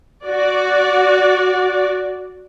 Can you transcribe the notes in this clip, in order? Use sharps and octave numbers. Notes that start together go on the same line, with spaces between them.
F#4 D5